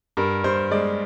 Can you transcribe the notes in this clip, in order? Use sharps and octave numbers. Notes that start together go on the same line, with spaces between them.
G2 A#4
G2 C5
G#3 D5